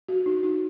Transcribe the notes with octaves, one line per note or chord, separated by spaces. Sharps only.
F#4
D#4
D#4